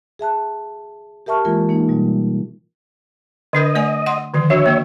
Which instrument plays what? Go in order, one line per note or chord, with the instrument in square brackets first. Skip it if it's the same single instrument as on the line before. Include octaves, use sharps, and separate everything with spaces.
[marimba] G#4 E5 A5 F#6
G4 A#4 E5 A5 C#6 F6
E3 G#3 A#3 F4 A#4
E3 A#3 D#4
B2 G3
[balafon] D3 D4 A#4 [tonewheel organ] D#5
[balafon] A3 D5 G#5
F#5 C6
D3 D#3 F3
[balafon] D4 F#4 [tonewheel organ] C#5 E5
[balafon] A#3